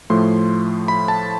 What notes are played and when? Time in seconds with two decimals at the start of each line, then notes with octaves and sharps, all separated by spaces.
0.10 A2 F3 A3 C6
0.88 B5
1.08 A5